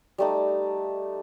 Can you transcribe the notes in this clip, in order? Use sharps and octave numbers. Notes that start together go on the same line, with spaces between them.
G3 A3 D#4